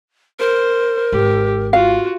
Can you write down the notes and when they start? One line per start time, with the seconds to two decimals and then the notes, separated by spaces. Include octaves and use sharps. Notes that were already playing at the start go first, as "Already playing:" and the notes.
0.40 A#4 C5
1.12 G#1 G4
1.73 F4 F#4 F5